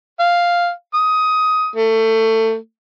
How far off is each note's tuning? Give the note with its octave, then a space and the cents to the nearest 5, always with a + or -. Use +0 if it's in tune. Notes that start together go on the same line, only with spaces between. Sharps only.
F5 +0
D#6 +15
A3 +25